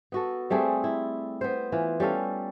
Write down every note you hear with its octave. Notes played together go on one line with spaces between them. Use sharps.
B3 F#4 A4
G3 A3 C4 G#4
E4
B3 C5
E3 F4
G3 C#4 A4 F5